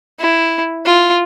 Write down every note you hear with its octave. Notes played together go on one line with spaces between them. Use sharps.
E4
F4